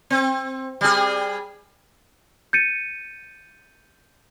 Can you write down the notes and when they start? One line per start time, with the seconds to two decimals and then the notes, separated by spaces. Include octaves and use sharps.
0.10 C4
0.81 G3 G#4
2.53 G6 A6 C#7 D#7